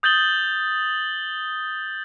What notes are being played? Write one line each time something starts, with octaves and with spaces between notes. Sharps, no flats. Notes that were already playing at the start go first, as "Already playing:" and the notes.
D#6 G6 A6 F#7 G7